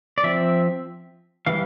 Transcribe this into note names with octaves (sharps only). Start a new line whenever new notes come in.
D5
F3 C4 E5
E3 G3 F5